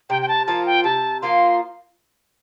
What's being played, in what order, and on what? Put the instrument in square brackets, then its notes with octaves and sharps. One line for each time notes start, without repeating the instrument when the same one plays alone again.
[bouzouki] C3 [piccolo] G5
[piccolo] G5
A5
[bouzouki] F3 A#3 F4 [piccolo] A5
[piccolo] G5
[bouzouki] C3 [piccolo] A5
[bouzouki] F3 A#3 F4 [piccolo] C6